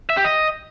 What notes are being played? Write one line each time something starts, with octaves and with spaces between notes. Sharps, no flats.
E5
G4
D#5